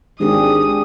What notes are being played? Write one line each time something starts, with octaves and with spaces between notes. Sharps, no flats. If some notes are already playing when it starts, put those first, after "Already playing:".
G#1 D4 G4 G#4 D#6